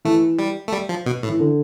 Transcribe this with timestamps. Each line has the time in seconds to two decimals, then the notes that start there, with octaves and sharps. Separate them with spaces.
0.05 E3 A3
0.39 G3
0.68 A3
0.72 G3
0.89 F3
1.06 B2
1.23 A2
1.28 E3
1.40 D3